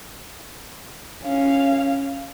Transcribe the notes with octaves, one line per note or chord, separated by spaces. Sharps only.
C#4 F5